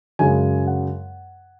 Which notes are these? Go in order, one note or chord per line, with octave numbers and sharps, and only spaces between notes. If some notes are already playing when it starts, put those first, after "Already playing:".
F#2 C#3 G#3 G#5
F#5